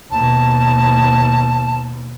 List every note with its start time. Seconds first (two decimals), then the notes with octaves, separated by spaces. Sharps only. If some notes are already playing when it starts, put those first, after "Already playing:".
0.11 D#2 B2 A5